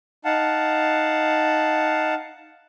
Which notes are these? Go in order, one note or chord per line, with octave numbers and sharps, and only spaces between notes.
D#4 F5 F#5 A5